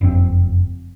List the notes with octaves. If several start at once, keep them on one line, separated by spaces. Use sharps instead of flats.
F#1 F2 A#2 C4